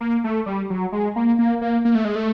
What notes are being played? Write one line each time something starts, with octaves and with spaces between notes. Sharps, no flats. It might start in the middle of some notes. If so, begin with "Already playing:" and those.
A#3
A3
G3
F#3
G#3
A#3
A#3
A#3
A#3
A3
G#3
A3